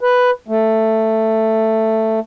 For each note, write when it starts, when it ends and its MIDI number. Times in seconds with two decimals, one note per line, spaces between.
0.01 0.31 71
0.48 2.20 57